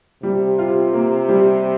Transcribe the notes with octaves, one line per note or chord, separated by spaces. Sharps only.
C3 G3
F4
A#3
G3